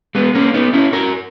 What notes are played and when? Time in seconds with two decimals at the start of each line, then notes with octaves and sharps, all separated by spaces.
0.15 G#3 B3
0.35 A#3 C#4
0.54 B3 D#4
0.73 C#4 E4
0.92 F#4 A#4